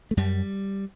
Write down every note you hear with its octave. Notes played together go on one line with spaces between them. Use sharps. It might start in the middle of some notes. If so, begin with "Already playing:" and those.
A3
F#2 G3